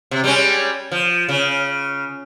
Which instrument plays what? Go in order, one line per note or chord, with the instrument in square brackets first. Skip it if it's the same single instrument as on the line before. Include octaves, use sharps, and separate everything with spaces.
[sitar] C3
G3 G#3 C#4
F3
C#3